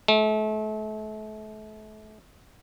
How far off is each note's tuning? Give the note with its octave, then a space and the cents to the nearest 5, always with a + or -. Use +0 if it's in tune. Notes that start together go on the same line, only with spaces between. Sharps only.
A3 -35